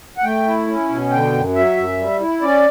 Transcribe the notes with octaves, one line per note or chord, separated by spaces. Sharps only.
F#5
A3 G5
E4
C#4
B2
D3 G5
F#2
F#3 E5
F#2
G3
E4
C#4 D5